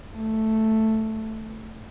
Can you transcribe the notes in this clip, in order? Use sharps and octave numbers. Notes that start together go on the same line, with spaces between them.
A3